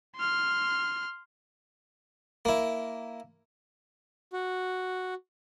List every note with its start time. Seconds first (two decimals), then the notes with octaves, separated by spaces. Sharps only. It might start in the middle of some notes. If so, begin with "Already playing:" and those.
0.16 C6 F6
2.45 A#3 E4
4.33 F#4